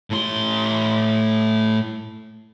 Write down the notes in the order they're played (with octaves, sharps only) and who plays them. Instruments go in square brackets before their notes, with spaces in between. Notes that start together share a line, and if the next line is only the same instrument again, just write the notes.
[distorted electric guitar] A2 C6